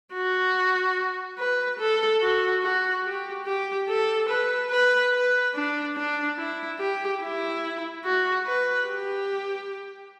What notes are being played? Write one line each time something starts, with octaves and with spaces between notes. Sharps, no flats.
F#4
B4
A4
F#4
F#4
G4
G4
A4
B4
B4
B4
D4
D4
E4
G4
E4
F#4
B4
G4